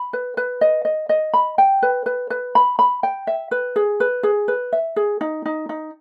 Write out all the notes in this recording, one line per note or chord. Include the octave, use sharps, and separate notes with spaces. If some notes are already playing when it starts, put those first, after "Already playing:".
Already playing: B5
B4
B4
D#5
D#5
D#5
B5
G5
B4
B4
B4
B5
B5
G5
E5
B4
G#4
B4
G#4
B4
E5
G#4
D#4
D#4
D#4